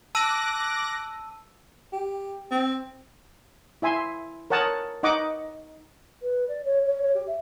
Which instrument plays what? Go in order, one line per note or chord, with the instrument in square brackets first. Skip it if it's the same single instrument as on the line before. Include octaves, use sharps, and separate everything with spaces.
[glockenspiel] A5 E6 D#7 [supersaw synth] D6 F#6 A#6
[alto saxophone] G4
C4
[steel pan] E4 E5 G#5 C6
A#4 C#5 F#5 A5 D#6
D#4 D#5 F#5 C#6 D6
[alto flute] B4
D5
C#5
C#5
C#5
G4
E5